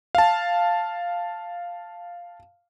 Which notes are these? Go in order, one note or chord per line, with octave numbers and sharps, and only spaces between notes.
F5 A5